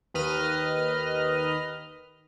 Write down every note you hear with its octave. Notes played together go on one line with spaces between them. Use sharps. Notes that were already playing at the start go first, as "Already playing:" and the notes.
D#2 D#3 B4 D#5 F6